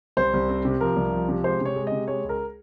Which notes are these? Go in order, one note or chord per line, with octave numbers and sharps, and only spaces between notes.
C2 C5
C2
C4
C3
F3 A#4
C2
F3
C3
G#3 C5
C3 C#5
G#3
C3 D#5
G#3 C#5
C#2
A#4